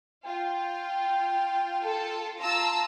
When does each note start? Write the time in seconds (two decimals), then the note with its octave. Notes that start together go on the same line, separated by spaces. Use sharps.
0.25 F4 G5
1.83 A4
2.41 F4 A5 A#5 E6